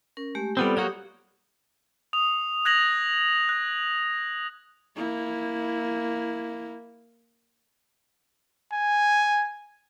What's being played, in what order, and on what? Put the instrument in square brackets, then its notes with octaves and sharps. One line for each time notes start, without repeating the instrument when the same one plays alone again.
[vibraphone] C#4 A#4
G#3 A3 G4
[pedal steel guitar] G3 B3 C4 [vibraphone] F4 A4 D5
[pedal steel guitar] F#3 A#3 F#4 [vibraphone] G4 D#6
[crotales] D#6 F7
F#6 G#6 A#6 F7 F#7
F#6
[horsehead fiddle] A#3 E4
[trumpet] G#5